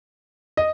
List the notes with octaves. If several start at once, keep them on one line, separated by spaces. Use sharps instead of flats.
D#5